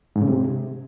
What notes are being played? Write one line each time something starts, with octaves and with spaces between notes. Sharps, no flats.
G#2
C#3
C3